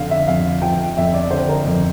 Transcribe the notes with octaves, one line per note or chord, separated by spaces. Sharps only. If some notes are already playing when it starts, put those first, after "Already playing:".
Already playing: F2 D3 F5
E5
F2 F5
F3 G5
F2 E5
D5
D3 C5
A#4
F2